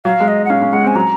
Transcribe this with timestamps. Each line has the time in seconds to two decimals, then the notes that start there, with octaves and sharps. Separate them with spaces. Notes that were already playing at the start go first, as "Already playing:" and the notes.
0.05 F#3 F5
0.20 G#3
0.28 D#5
0.45 F#5
0.50 C#4 F5
0.62 C#4
0.73 G#3 F#5
0.84 C4
0.87 G#5
0.95 F#3 A#5